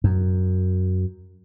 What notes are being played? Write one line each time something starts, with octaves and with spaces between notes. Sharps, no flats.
F#2